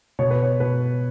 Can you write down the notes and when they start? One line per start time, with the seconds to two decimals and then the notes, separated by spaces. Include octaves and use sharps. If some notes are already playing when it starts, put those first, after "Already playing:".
0.19 B2 C#5
0.31 B4
0.43 C#5
0.60 B2 B4